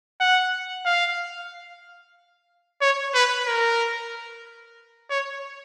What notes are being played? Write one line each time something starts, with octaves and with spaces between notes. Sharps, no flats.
F#5
F5
C#5
B4
A#4
C#5